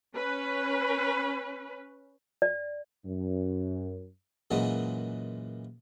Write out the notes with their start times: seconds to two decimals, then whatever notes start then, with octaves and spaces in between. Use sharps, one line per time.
0.14 C#4 B4
2.42 D5
3.05 F#2
4.51 F#2 A#2 E3 F#3 G#3